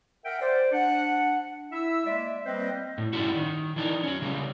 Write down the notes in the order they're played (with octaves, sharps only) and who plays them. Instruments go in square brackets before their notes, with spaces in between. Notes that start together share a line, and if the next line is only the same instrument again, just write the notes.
[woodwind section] A#4 E5 F#5 G5
C5 D5
D4 F#5
E4 E5 E6
G#3 A#3 D5 E5
G3 A#3 C4 B4 C5 D#5
[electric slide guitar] A2
G2 C#3 G#3 D4 E4 F#4
D#3
E3 D4 D#4
F#3 C#4
C#3 G3 G#3